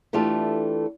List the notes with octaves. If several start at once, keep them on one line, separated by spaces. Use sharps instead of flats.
E3 A3 D4 F4 G4 A4